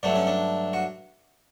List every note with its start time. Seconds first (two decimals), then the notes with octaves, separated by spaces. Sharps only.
0.03 G2 F#3 A3 D4
0.16 C#4
0.27 D4
0.73 F#4